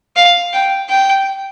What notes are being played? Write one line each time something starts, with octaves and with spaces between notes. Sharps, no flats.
F5
G5
G5